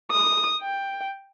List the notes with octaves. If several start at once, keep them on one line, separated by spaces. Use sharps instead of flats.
D#6
G5